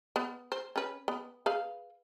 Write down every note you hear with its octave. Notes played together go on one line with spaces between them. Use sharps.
B3
C5
C#4 B4
B3
G#4 B4 F5